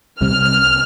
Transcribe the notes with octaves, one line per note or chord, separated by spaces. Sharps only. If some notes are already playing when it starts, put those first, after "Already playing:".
C2 C3 G3 C4 F6